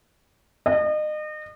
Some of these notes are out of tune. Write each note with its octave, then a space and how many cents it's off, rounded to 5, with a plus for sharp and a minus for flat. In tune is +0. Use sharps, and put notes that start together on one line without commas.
D#5 -35